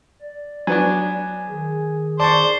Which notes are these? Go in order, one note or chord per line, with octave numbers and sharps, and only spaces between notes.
D5
F#3 B3 D4 G#5
D#3 G#4
C5 D5 A5 C#6